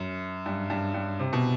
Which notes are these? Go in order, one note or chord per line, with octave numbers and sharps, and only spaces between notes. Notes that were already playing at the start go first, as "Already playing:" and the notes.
Already playing: F#2
G2
G2
G2
C3
B2